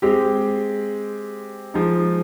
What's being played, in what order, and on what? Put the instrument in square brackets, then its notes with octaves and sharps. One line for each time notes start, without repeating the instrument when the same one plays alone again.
[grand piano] G#3 C4 G4
F3 G#3 D#4